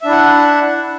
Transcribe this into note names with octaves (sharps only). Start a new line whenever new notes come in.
D4 E4 E5 F#5